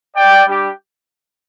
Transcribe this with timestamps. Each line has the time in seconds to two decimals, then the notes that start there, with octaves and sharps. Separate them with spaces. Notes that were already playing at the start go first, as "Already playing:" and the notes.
0.16 D5 G5
0.47 G3 D4 G4